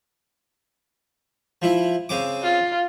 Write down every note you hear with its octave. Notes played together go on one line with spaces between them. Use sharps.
F3 E4
C#3 C4 D6
F4